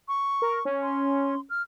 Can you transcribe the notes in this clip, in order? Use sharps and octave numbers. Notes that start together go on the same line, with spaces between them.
C#6
A#4
C#4
C6
F6